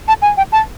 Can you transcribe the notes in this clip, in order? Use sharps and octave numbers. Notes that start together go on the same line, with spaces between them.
A5
G#5
G5
A5